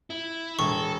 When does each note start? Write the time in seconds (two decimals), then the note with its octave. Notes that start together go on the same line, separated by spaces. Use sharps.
0.10 E4
0.59 E1 A4 C#6